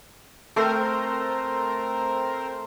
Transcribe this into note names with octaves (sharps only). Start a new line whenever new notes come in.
A3 C4 A#4 C5